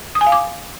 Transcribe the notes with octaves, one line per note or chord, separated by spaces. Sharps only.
D#6
G#5
F5
D6